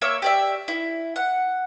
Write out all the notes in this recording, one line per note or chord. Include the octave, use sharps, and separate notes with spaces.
A#3 C#5 E5 E6
G4 D5 E5
E4
F#5